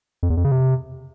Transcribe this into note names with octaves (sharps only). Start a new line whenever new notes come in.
F2
E2
F2
C#3
C3